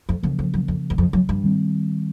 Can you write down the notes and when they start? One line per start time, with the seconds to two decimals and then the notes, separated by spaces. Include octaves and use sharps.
0.09 F2
0.23 F2 C#3 F3 A#3
0.39 F2
0.54 F#2
0.68 F2
0.90 E2
0.98 F2
1.13 F#2
1.29 G2
1.43 D#3 G3 C4